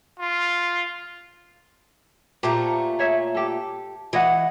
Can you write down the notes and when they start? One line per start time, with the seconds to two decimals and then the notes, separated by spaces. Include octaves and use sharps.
0.20 F4
2.43 A#2 A3 G4 A4 C5 A#5
2.99 G#4 C#5 E5
3.35 G4 A4
4.13 E3 G#4 D#5 F#5